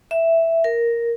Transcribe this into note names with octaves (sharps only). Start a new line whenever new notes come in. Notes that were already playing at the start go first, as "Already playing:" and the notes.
E5
A#4